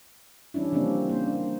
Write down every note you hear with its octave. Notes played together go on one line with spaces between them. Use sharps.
E3 G3 C#4 D4 E4
C#3 F3 G3 A#3 C4 D4
A#3 C5
D4